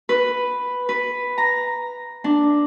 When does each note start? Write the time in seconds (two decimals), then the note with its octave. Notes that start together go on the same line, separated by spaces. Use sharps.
0.09 B4
0.89 B4
1.38 A#5
2.24 D4